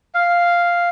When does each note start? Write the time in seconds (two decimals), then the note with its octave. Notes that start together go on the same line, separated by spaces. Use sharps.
0.14 F5